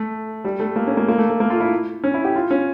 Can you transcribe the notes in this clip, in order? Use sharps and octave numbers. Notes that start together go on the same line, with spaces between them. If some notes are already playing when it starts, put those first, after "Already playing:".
Already playing: A3
G3
A3
A#3
C#4
A#3
A#3
A3
A3
A#3
F4
E4
C#4
E4
G4
F4
C#4